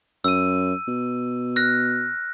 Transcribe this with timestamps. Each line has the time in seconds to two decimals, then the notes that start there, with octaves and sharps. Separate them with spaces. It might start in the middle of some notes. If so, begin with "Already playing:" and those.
0.24 F#2 E6 D#7
0.88 B2
1.56 F6 F#6 A#6